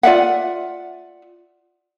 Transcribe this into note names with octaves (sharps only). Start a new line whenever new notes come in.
F4 D5 E5 F#5